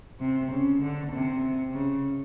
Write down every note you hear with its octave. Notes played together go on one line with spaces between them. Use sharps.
C3
C#3
D3
C3
C#3